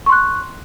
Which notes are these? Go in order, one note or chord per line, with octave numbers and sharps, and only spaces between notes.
C6 C#6 F#6